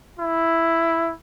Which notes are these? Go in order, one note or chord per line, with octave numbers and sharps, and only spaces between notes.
E4